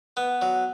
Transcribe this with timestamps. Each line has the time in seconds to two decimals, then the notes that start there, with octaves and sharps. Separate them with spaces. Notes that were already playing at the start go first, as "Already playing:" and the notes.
0.17 B3
0.42 F#3